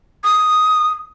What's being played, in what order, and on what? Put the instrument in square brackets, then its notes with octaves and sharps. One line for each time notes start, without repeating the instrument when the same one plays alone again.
[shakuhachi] D#6